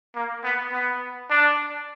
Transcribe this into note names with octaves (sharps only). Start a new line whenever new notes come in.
A#3
B3
B3
D4